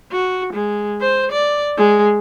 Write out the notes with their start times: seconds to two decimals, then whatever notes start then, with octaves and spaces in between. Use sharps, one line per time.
0.12 F#4
0.54 G#3
1.01 C5
1.32 D5
1.77 G#3